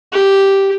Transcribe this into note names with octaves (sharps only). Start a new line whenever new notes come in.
G4